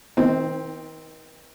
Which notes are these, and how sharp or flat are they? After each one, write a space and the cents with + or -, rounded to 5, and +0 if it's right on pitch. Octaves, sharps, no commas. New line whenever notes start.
D#3 +40 C4 +0 D#4 +0